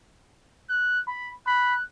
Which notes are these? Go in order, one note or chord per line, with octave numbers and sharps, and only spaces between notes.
F#6
B5
B5 F#6